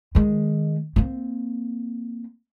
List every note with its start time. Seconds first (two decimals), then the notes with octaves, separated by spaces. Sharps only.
0.15 D#3 G#3
0.96 A#3 C4